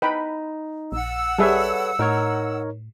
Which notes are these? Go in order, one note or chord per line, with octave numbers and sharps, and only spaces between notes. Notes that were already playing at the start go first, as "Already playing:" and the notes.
D#4 B4 G5 B5
A#1 F#5 E6
G3 G#4 A4 B4 C#5 E5
A2 D#4 A#4 C#5